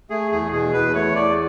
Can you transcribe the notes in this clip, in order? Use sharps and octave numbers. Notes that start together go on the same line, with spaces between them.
A3 G#4
E2 G#4
B2 G#4
E2 B4
A3 C#5
E2 D5